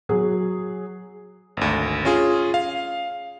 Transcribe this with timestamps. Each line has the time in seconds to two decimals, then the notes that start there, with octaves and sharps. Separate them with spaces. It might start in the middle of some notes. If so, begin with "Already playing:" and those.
0.09 F#3 G#4
1.57 G#1 D2
2.05 C#4 F4 G#4
2.54 F5